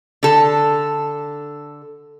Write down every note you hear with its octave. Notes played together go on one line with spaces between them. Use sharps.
D3 A4